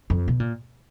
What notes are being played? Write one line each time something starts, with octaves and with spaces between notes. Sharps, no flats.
F2
B2
A#2